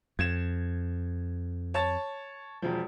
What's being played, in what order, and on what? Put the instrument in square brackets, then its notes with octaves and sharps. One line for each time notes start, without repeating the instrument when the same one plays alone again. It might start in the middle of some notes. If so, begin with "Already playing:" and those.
[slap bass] F2 [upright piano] G#6 E7
[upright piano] C#5 A5 A6
E1 F3